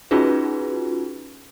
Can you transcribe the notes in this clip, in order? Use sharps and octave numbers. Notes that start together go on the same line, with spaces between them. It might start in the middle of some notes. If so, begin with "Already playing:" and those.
C#4 D#4 F4 F#4 G#4 B4